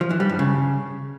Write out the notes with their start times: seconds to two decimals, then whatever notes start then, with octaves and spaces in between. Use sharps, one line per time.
0.01 F3
0.10 E3
0.20 G3
0.29 G2
0.39 C#3